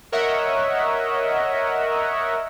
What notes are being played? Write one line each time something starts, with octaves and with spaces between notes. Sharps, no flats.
A#4 C#5 D#5 E5 F#5